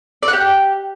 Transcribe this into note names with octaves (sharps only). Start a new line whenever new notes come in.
D5
F#5
G4